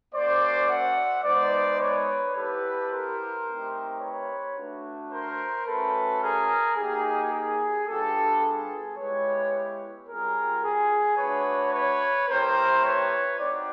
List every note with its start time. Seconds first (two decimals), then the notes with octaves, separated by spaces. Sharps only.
0.14 A#3 C#4 F#4 C5 D5
0.69 E5 F#5
1.24 G#3 B3 D#4 C5 D5
1.80 B4 C#5
2.35 B3 E4 G4 A4 B4
2.90 A#4 C5
3.45 A3 C4 D#4 G4
4.01 B4 C#5
4.56 A3 D4 F#4
5.11 A#4 C5
5.66 A3 C#4 F#4 A4 B4
6.21 G#4 A#4
6.76 A#3 D#4 G4 G#4
7.32 G#4
7.87 G3 B3 D4 F4 G4 A4
8.42 G#4
8.97 G#3 B3 E4 G4 B4 C#5
10.08 G3 C4 F4 G#4 A#4
10.63 G#4
11.18 A3 D4 F#4 B4 C#5
11.73 B4 C#5
12.28 A3 C4 E4 G4 A#4 C5
12.84 B4 C#5
13.39 C4 D#4 F#4 C5 D5